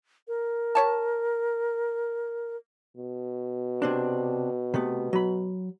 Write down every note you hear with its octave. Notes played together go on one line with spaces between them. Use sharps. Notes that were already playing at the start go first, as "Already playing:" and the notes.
A#4
G4 C#5 A5
B2
C3 C4 D4
C3 A3 B3
F#3 B5